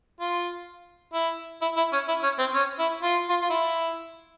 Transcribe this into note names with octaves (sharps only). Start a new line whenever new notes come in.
F4
E4
E4
E4
C#4
E4
C#4
C4
C#4
E4
F4
F4
F4
E4